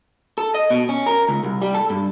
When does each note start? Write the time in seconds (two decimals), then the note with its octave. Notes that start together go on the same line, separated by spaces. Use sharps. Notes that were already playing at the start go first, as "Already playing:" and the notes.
0.38 A4
0.54 D#5
0.70 B2
0.89 C#4
1.07 A#4
1.29 C#2
1.44 C2
1.62 G3
1.75 A4
1.90 G2